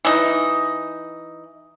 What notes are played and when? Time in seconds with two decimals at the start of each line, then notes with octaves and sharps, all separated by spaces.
0.05 E3 D#4